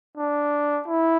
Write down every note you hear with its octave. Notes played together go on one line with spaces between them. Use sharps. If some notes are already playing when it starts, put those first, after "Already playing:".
D4
E4